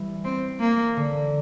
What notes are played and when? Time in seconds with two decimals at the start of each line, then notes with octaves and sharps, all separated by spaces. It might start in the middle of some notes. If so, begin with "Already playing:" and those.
Already playing: E3 G3
0.24 C4
0.60 A#3
0.97 D3